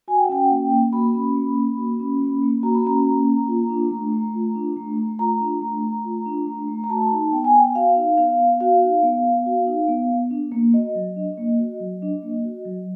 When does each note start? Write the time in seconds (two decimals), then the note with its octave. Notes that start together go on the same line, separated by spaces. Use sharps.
0.08 F#4 G#5
0.16 G5
0.24 F#5
0.29 C#4 G5
0.49 A#3
0.71 A#3
0.92 F#4 B5
1.14 C#4
1.35 A#3
1.56 A#3
1.78 F#4
2.00 C#4
2.20 A#3
2.43 A#3
2.63 F#4 A#5
2.75 B5
2.85 C#4 A#5
3.07 A#3
3.27 A#3
3.48 F4
3.70 D4
3.91 A3
4.12 A3
4.34 F4
4.55 D4
4.77 A3
4.97 A3
5.19 F4 A#5
5.40 D4
5.62 A3
5.83 A3
6.05 F4
6.26 D4
6.47 A3
6.68 A3
6.84 A#5
6.89 F#4 A5
7.11 D#4
7.32 B3 G5
7.44 G#5
7.54 B3 G5
7.75 F#4 F5
7.97 D#4
8.18 B3 F5
8.39 B3
8.60 F#4 F5
8.82 D#4
9.03 B3
9.25 B3
9.46 F#4
9.66 D#4
9.88 B3
10.10 B3
10.31 D4
10.52 A#3
10.73 F#4 D#5
10.95 F#3
11.16 D4
11.38 A#3
11.59 F#4
11.80 F#3
12.02 D4
12.22 A#3
12.45 F#4
12.65 F#3